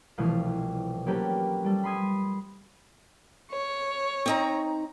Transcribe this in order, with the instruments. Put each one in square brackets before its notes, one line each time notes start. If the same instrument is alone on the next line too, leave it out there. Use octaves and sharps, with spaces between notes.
[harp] C2 B2 E3 F3 A3 F5
F#3 A#3 C#4 G4 A4 B4
G3 A4
B5 C6 D#6 G#6
[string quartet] C#5
[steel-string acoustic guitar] C4 D#4 A#5